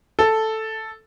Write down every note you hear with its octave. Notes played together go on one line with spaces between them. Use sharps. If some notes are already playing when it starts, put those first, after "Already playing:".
A4